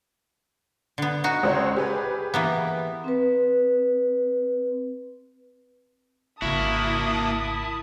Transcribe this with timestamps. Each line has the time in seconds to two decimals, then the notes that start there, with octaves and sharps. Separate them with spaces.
0.98 D3 B3
1.24 D#4 F#4
1.43 C#2 C5 C#5
1.76 G4 G#4 B4
2.34 E3 A#3 B3
3.04 C4 B4
6.42 G#1 C#3 A#3 E4 F#4 A5 D#6